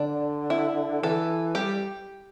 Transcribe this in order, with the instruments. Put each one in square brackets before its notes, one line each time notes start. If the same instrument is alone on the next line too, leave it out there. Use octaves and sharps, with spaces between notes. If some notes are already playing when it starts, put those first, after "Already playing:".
Already playing: [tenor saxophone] D3 [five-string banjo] D4
[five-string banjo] E4
[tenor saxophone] E3 [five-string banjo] A4
[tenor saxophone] G3 [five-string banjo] G4